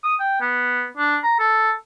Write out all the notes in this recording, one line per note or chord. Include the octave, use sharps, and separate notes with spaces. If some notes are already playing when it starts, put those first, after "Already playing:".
D#6
G5
B3
D4
A#5
A4